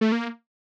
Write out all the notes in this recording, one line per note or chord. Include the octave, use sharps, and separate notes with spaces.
A3
A#3